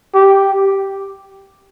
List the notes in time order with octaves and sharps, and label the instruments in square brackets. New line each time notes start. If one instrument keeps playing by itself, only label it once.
[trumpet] G4